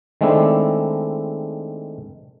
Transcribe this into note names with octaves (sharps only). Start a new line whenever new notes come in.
D#3 G#3 A3 C4 D4 E4